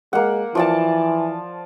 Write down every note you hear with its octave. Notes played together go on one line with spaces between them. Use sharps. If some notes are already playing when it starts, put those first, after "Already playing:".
G#3 A#3 F#5
E3 F3 D5 A5